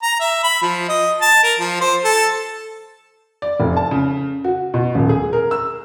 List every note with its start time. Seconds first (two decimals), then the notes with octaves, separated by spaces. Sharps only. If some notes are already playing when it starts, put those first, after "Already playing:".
0.03 A#5
0.20 E5
0.44 B5
0.62 F3
0.89 D#5
1.21 A5
1.43 A#4
1.60 F3
1.81 C5
2.04 A4
3.42 D5
3.60 F1
3.77 A5
3.91 C#3
4.44 F#4
4.74 B2
4.95 D#1
5.09 G#4
5.33 A#4
5.51 E6